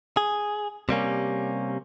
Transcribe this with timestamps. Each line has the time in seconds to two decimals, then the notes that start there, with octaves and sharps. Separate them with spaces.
0.17 G#4
0.89 C3 G3 A#3 C#4